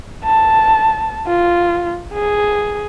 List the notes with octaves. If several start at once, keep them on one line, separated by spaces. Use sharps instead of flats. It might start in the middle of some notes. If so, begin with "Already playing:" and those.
A5
F4
G#4